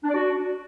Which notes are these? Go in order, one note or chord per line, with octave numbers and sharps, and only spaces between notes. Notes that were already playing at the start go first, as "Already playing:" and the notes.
D4
D5
F#4